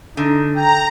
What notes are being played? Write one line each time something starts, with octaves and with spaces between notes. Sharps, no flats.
D3 D#4
G5 A#5